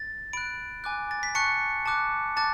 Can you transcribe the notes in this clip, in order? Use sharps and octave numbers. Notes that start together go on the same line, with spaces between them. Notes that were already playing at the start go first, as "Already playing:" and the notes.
Already playing: A6
B5 F#6 D7
G#5 D6 F#6
A6
B6
A5 C#6 F#6 C#7
A5 D6 F#6
A5 D6 F#6 A6